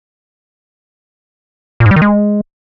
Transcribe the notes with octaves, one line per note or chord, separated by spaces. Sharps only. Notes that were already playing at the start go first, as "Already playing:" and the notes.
A#2
G#2
G3
D#3
G#3